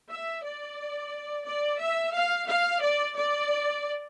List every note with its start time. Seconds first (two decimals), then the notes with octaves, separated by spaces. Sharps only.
0.10 E5
0.44 D5
1.45 D5
1.80 E5
2.14 F5
2.48 F5
2.82 D5
3.16 D5